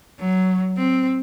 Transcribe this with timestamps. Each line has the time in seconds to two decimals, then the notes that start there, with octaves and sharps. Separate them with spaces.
0.19 F#3
0.77 C4